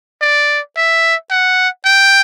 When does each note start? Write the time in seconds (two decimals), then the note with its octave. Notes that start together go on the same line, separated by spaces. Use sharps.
0.21 D5
0.77 E5
1.30 F#5
1.85 G5